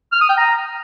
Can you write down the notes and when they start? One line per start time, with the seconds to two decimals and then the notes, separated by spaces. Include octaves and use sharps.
0.12 F6
0.21 D#6
0.29 G5
0.37 A#5